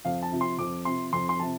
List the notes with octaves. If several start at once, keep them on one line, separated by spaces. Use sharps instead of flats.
F2 F5
A5
C3 F3
C6
F2 D6
C3 F3 C6
F2 C6
C6
C3 F3 A5